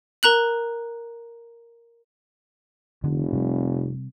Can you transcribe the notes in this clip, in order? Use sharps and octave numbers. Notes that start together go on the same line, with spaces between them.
A#4 A#5 F#6 F#7
F1 D3
C3 G3